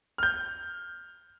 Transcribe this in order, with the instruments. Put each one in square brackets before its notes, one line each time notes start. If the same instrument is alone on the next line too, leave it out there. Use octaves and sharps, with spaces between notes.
[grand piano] F6 G6